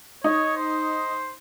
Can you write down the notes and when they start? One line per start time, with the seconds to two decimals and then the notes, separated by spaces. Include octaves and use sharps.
0.24 D#4 C#5
0.56 C5